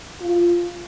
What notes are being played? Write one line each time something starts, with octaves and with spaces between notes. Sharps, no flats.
F4